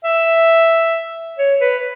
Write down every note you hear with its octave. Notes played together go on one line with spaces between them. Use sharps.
E5
C#5
B4